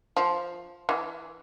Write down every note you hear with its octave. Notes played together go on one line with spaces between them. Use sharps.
F3
E3